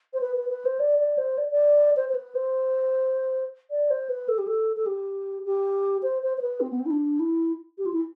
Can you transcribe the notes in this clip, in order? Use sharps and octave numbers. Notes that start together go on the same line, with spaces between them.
C5
B4
B4
B4
C5
D5
D5
C5
D5
D5
C5
C5
B4
C5
D5
C5
B4
A4
G4
A4
A4
G4
G4
C5
C5
C5
B4
C4
B3
C4
E4
D4
E4
G4
F4
E4